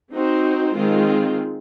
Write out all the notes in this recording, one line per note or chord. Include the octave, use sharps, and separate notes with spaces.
C4 D#4 F#4 C5
D#3 G#3 C4 F4